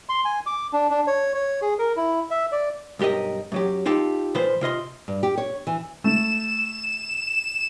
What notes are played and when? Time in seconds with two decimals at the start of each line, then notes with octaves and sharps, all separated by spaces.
0.09 C6
0.25 G#5
0.46 D6
0.73 D4
0.90 D4
1.07 C#5
1.34 C#5
1.62 G#4
1.79 A#4
1.96 E4
2.30 E5
2.52 D5
2.99 B1 G2 G4 A#4 D#5
3.52 F#2 F#3 G4
3.86 D#4 F4 G4 A4
4.35 A#2 F3 B4 C5
4.61 C3 F4 D#5 C6
5.08 G2
5.23 G4
5.37 C#5
5.67 E3
6.04 A3 E7